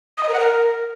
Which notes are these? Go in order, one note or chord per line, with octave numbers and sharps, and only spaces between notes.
D#6
D#5
A#4
F#5
A#4